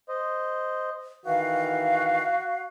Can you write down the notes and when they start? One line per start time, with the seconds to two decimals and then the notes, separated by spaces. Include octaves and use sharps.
0.09 C5 D#5
1.25 D#3 E3 F#4 F5